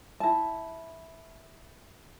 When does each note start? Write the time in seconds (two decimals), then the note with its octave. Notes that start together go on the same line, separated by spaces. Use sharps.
0.20 E4 A5